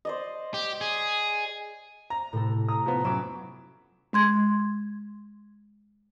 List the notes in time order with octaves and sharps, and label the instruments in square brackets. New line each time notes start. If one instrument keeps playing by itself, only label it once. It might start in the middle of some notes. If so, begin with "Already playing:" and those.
[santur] C5 D5 D#5
[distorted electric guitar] G4
G#4
[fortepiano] A#5
[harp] A2 C3 A4
[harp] A#5 [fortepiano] D#6
[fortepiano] F3 B3
[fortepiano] F#2 F#3 [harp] B5 D6 E7
[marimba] G#3 C6 G#6